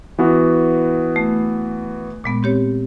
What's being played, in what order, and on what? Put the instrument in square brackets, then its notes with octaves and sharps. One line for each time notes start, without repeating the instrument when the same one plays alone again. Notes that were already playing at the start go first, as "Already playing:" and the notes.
[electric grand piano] E3 B3 F#4
[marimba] A3
A#2 G#3 B3
C4 G4 C#5